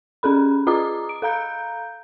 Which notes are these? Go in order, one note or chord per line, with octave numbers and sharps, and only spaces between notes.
C#4 G#4 A4 B5
F4 G#4 D#5 A#5 D6 D#6
D7
A4 F5 A#5 G6